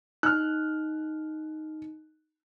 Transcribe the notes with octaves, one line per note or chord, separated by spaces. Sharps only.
D#4 F6 F#6